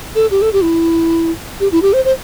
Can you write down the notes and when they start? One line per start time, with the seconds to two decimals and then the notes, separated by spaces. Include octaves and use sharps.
0.15 A4
0.31 G4
0.42 A4
0.53 G4
0.63 E4
1.60 G4
1.72 E4
1.82 G4
1.93 C5
2.05 C5